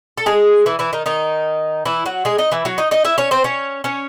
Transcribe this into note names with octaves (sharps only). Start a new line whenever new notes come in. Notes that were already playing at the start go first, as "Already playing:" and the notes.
A4
G#3 G#4
E3 E4
E3 E4
D#3 D#4
D#3 D#4
E3 E4
F#3 F#4
G#3 G#4
D#4 D#5
E3 E4
F#3 F#4
D#4 D#5
D#4 D#5
E4 E5
C#4 C#5
C4 C5
C#4 C#5
C#4 C#5